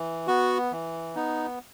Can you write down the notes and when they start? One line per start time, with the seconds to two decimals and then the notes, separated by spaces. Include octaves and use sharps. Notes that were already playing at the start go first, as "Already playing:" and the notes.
Already playing: E3
0.27 B3 F#4
0.72 E3
1.15 B3 D#4